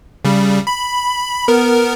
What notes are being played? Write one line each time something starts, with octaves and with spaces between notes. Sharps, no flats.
C#3 G3
B5
B3 A#4